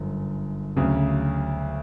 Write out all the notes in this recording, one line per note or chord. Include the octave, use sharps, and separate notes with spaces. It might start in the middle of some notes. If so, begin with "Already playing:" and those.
Already playing: G1 F#2
D2 C#3 F#3